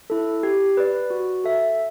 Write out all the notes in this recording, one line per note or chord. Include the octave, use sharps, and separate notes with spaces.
E4 A4
G4
B4 D5
F#4
A4 E5